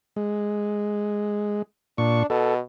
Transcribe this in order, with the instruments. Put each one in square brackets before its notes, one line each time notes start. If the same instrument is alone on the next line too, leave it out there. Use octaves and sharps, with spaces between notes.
[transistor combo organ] G#3
[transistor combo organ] A#2 C#6 [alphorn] D4
[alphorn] B2 [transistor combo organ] A4